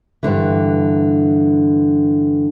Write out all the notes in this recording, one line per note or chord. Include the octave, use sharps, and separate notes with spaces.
G2 B2 D3 E3